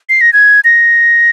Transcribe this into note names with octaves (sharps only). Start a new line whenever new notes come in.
C7
A#6
G#6
A#6